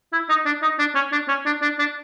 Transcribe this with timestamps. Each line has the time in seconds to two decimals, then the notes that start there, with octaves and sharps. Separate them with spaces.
0.13 E4
0.29 D#4
0.46 D4
0.62 D#4
0.79 D4
0.95 C#4
1.12 D4
1.29 C#4
1.46 D4
1.62 D4
1.79 D4